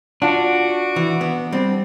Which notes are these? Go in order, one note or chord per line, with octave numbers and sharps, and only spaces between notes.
D4 F4 F#4
E3
B3
G3 C4